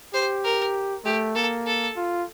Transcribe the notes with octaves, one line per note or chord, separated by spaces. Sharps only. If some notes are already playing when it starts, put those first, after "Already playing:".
G4 C5
A#4
A3 G4
A#3 A4
A4
F4